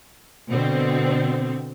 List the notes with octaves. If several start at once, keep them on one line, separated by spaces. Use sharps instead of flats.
B2 D3 C4